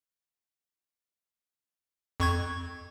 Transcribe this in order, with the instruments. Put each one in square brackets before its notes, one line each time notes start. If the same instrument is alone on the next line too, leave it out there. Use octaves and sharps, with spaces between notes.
[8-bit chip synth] F2 C#6 G#6